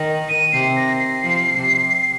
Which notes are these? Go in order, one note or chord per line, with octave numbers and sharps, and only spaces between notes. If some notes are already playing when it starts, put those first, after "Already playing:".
Already playing: D#3
D#7
C3 C7
A#6
C7
F3
C3